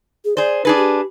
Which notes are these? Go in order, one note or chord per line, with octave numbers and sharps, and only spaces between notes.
G#4
G#4 C5 D5
D4 D#4 G#4 B4
G4